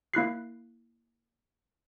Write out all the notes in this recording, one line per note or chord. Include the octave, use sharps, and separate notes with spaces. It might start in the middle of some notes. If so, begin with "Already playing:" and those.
A#3 E4 F#6 C7